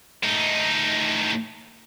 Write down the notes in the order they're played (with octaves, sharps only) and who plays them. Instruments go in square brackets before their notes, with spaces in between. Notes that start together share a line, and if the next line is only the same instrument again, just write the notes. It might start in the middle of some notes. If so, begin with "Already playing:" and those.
[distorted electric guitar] A2 D#4